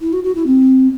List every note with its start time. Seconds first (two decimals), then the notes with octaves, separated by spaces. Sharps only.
0.01 E4
0.13 F#4
0.24 F#4
0.35 E4
0.46 C4